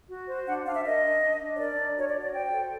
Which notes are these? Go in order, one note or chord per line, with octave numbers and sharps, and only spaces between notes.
F#4
C5
D4 F#5
D4 F5
E5
A#4 D#5
D4
D4
D4
C#5
A#4 D5
D4
F#4 C#5
D5
F#4
D5
C5 G5
A4